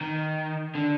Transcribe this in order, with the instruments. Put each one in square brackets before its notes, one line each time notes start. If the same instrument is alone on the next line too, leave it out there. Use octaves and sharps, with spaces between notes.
[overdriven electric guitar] D#3
D3